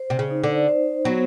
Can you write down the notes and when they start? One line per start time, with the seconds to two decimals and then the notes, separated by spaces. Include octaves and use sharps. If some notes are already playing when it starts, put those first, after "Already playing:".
Already playing: C5
0.10 C3
0.19 C#3
0.31 D#4
0.44 D3
0.68 C5
1.05 F#3 B3